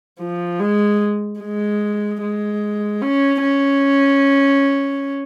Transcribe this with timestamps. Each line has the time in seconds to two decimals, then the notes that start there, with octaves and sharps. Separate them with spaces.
0.19 F3
0.60 G#3
1.40 G#3
2.21 G#3
3.02 C#4
3.42 C#4